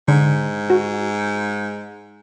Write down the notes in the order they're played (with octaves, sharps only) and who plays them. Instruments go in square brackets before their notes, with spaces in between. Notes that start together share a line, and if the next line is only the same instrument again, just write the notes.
[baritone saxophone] G#2 [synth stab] D3
[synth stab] F#4